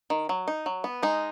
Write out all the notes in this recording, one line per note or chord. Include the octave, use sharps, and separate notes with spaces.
D#3
F#3
D#4
F#3
B3
G#3 D#4